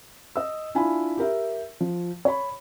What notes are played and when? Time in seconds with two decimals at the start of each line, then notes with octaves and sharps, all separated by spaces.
0.36 D#5 E6
0.75 D4 E4 F4 G#5 B5
1.18 G4 A#4 E5
1.81 F3
2.25 C#5 B5